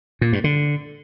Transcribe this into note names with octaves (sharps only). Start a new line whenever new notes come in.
A#2
G2
D3